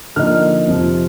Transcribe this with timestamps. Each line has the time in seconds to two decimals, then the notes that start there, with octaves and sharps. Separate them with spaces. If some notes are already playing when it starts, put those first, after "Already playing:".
0.16 D3 F3 A#3 D#4 F6
0.67 F2 C3 F3